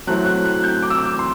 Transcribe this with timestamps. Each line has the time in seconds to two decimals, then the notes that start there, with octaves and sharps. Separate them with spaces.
0.07 F#3 A3 C4 E4 F#6
0.26 F#6
0.45 F#6
0.64 G6
0.83 D6
0.90 E6
0.98 D6
1.19 C6